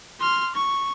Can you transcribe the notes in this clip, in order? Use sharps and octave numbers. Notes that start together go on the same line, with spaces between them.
C6 F6
C#6